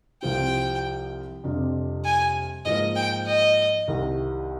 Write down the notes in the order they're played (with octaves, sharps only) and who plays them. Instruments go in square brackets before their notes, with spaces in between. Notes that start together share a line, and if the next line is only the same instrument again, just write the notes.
[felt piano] C2 C3 F3 C4 F4 [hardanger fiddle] G5
[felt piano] F2 C3 G3 D4 F4
[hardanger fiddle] G#5
[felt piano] G#2 F3 A#3 F4 [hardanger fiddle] D#5
[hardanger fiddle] G5
D#5
[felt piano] C2 C3 D#3